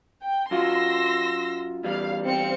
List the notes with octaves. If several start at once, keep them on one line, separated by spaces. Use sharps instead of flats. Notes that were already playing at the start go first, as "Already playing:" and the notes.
G5
F#2 F4 F#4 C6 E6 A#6
E2 G3 F5
C4 F5 C#7